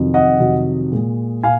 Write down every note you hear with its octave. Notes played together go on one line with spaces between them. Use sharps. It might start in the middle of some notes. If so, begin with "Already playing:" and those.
Already playing: F2 C3 D#3 F#3
D#5 F#5
F2 C3 D#3 F#3
A#2 G#3
A#2 F5 G#5